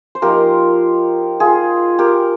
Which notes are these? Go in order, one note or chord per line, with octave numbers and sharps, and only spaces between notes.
C5
F3 A#3 D#4 G4 A#4
F4 G#4
G4 A#4